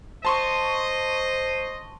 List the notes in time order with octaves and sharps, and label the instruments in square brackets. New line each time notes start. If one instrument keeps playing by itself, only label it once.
[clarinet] C5 [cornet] D#5 [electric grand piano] A5 C6 C#6